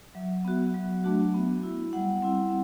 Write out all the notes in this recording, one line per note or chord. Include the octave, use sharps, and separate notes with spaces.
F#3 E5
B3 F#4
F#3
A3 D4 F#4
B3
E4
G3 F#5
C4 E4